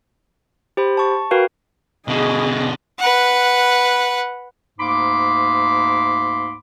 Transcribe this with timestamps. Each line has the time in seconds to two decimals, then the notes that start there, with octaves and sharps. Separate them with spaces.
0.77 G4 C5 B5
0.97 A5 C#6
1.31 F#4 A#4 B4 F5 G5
2.08 B2 D3 G#4 D#5
2.99 B4 F#5
4.79 D2 G#2 A#3 B5 C6 D6